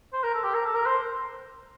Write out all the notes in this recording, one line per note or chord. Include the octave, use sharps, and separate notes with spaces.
C5
A#4
A4
G4
A#4
A4
A#4
C5